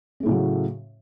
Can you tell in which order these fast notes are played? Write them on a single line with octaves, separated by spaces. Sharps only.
C#4 A3 A2 C#3 F#3